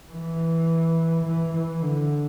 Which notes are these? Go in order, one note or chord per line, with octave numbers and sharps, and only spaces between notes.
E3
E3
E3
D3